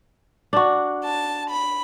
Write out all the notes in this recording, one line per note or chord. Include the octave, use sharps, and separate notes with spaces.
D4 F#4
A5
B5